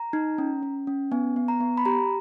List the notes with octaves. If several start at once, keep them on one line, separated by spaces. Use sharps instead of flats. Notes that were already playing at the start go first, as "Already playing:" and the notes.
Already playing: A#5
D#4
C#4
C#4
C#4
B3 G#5
B3
A#5
B3
B5
G4 A#5